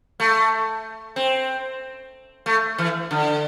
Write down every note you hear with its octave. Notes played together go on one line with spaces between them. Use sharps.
A3
C4
A3
E3
D3